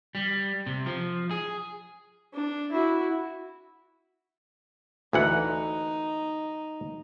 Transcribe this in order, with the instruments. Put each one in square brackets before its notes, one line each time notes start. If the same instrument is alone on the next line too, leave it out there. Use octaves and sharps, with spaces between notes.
[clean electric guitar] G3
C3
F3
G#4
[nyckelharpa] D4
E4 F#4
[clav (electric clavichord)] D2 E3 F#5 [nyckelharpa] D#4